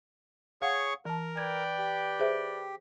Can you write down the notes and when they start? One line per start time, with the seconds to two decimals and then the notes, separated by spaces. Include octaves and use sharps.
0.62 G#4 C#5 F5 F#5 C#6
1.05 E3 A#4 A5
1.37 B4 D5 G5 G#6
1.78 G4
2.20 G#4 C5 E5